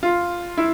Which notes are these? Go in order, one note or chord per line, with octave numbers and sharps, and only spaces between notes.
F4
E4